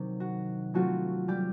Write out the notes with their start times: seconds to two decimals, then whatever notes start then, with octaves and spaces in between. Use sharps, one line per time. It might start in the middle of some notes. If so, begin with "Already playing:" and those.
Already playing: C3 D#3 F#3
0.20 F#4
0.74 F#3 A3 C4 F4 F#4
1.28 G3 G4